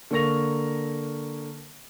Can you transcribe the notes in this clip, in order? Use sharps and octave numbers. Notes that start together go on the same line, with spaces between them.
D3 A#3 A#4 C#6 A#6 F7